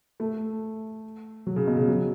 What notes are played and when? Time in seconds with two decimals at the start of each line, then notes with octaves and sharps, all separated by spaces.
0.20 A3
1.47 F#3
1.56 C#3
1.67 B2
1.77 C#3
1.88 F#3